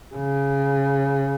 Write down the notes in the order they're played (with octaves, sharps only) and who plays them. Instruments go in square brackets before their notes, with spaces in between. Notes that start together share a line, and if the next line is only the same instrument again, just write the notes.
[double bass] C#3